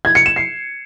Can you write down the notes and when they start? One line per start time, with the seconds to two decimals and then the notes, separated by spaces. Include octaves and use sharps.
0.05 G#6
0.15 C#7
0.26 E7
0.36 C7